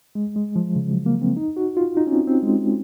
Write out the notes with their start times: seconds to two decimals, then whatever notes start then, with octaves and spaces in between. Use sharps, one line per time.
0.15 G#3
0.36 G#3
0.56 F3
0.76 C#3
0.91 F#3
1.06 A#3
1.22 C4
1.37 D#4
1.57 F#4
1.77 F4
1.97 D#4
2.07 C#4
2.13 C4
2.27 C4
2.43 G#3